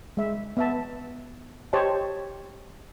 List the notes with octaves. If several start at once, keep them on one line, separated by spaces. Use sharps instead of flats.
G#3 E5
B3 E5 A5
G4 C5 C#5 D#5 A5